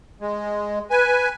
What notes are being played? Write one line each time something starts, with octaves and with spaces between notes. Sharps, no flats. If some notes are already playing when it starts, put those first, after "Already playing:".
G#3
B4 G#5